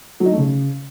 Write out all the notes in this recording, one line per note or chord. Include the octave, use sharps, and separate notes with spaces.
F#3
D#4
A3
C#3